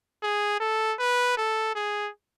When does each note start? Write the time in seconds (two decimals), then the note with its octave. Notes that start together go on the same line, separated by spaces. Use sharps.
0.23 G#4
0.60 A4
0.99 B4
1.37 A4
1.75 G#4